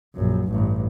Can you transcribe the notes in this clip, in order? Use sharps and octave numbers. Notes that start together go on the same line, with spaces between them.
A#1 F#2
A1 G2